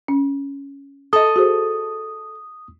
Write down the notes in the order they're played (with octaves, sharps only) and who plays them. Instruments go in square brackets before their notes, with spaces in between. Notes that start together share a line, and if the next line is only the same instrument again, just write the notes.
[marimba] C#4
[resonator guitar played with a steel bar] A4 D#5 [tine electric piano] D#6
[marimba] F#4 G#4 C5